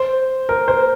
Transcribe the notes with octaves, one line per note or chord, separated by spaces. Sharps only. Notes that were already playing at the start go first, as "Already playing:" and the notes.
Already playing: C5
A#4
C5